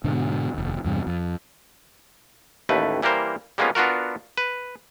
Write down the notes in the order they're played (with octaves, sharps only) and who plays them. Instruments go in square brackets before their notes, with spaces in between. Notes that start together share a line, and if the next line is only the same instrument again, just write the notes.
[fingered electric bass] G#2 B2 D3
F1 D#2
E2 G2 C3
F2
[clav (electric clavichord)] A1 D#2 A3 B4
E3 G3 A#3 A#4 C5
G3 G#3 A#3 B3 C#4 F4
B3 D4 F4 F#4 A#4
B4